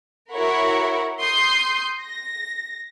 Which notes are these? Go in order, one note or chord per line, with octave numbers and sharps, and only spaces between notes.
E4 F#4 A#4 C#5 F#5 B5
C6 D#6 G6 C7
A#6